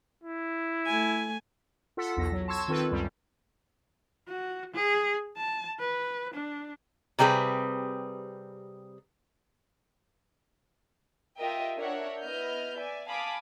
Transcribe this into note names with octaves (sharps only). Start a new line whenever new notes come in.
E4
A3 G#5
F4 A4 F#5 B6
B1 E2 A4 A#6
F#3
A5 C6 C#6 E6 G#6
D#3 C4 F4 A4 B4
C#2 F#2 G3
F#4
G#4
A5
B4
D4
C3 G3 C4 G#4 B4
F4 G4 A#4 D#5 E5 G5
D4 A#4 C#5 E5 F#5
B3 E4 D#5 F6 G6
D5 E5 G#5
F5 G#5 A5 B5 D6 D#6